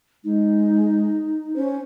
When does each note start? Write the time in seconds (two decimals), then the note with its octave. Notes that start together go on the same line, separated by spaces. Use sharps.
0.24 G#3 D#4
1.56 C#4 C5